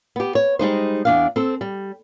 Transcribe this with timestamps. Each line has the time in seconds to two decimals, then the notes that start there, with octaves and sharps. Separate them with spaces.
0.16 B3 G4
0.35 C#5
0.59 G3 G#3 D#4 C5
1.05 E2 D4 F5
1.36 C4 A4
1.61 G3